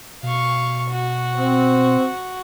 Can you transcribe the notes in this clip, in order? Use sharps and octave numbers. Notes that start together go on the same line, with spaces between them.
B2 F5 C#6
F#4
C4